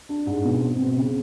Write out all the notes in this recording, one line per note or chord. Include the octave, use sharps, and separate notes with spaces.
D4
G#2
B2
C4
B2
C#3